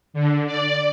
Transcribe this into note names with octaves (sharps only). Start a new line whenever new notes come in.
D3
D5